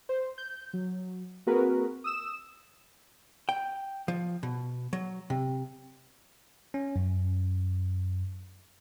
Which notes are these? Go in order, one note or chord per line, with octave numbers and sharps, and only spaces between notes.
C5
G6
F#3
A#3 C4 F#4 G#4 A#4 B4
D#6 E6 E7
G5
F3
B2
F#3
C3
C#4
F#2